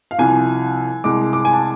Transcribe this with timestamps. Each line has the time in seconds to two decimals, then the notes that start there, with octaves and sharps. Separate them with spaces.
0.11 F5
0.19 C2 C3 F3 G#5
1.04 C2 C3 G#3 D6
1.33 D6
1.45 G#5
1.53 A5